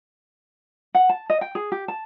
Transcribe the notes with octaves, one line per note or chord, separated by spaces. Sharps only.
F#5
A5
D#5
G5
G#4
G4
A5